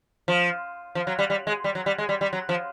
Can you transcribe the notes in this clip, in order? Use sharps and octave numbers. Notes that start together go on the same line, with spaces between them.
F3
F3
F#3
G3
G3
G#3
G3
F#3
G3
G#3
G3
G3
F#3
F3